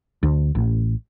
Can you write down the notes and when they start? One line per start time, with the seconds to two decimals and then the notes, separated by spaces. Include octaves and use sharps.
0.23 D2
0.55 A1